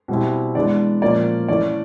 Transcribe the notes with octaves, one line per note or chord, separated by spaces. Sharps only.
B2 G3 C4 E4
E3 G#3 B3 D4 D5
A#2 F3 A#3 C#4 D5
E3 A3 C#4 D5